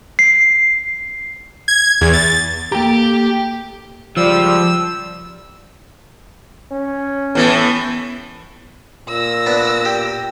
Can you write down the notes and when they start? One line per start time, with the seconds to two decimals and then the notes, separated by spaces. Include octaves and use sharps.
0.19 C7
1.68 G#6
2.01 E2
2.13 A6
2.72 A#3 G4 A4 G5 A#5
4.17 C#2 F3 G3 D5 E6
6.71 C#4
7.35 A2 E3 B3 A4
9.08 A#2 E6 A#6
9.46 B3 D4
9.85 G4